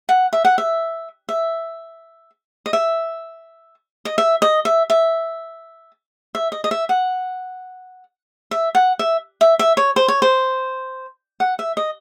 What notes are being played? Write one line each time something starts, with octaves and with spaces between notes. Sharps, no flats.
F#5
E5
F#5
E5
E5
D#5
E5
D#5
E5
D#5
E5
E5
E5
D#5
D#5
E5
F#5
E5
F#5
E5
E5
E5
C#5
C5
C#5
C5
F#5
E5
D#5